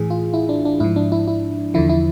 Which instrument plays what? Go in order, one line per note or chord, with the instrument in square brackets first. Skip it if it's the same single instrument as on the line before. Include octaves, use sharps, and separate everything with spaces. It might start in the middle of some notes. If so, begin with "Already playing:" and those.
Already playing: [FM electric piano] A2 E3 G#4
F4
E4
D4
D4
G#2 F3 E4
D4
E4
E4
E2 D3 F3 E4
E4